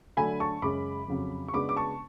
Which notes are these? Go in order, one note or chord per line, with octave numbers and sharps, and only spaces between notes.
D3 F#3 A3 D4 G#5 B5
A5 C#6
F#2 C#3 G#3 C#4 B5 D6
F2 C#3 F#3
C#6
C#3 G#3 B3 D4 B5 D6
D6
A5 C#6